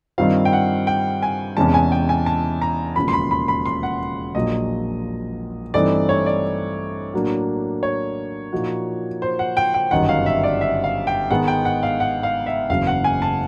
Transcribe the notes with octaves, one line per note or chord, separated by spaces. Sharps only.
G2 D#3 G3 C4 F4 F5
G5
F#5
G5
G#5
E2 C3 E3 G#3 C#4 A5
G#5
G5
G#5
A5
A#5
E1 D#2 C#3 F3 A#3 B5
C6
B5
B5
B5
C6
F#5
A#1 A#2 F#3 D#5
G2 E3 A3 C4 D#4 D5
C#5
D5
A2 F#3 A#3 D4 F#4
C#5
A#2 F3 A#3 D#4 F#4
C5
F#5
G5
G5
G1 F#2 D#3 F#5
F5
E5
D5
E5
F5
G5
G#2 D#3 G#3 B3 F#5
G5
F#5
F5
F#5
F5
E5
F#1 E2 C#3 F#3 F5
F#5
G#5
A5